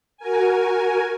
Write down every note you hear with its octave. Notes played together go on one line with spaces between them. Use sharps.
F#4 A#4 G#5